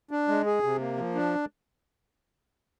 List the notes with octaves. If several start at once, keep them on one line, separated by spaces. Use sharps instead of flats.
D4
G#3
G#4
C3
A#3
F3
D4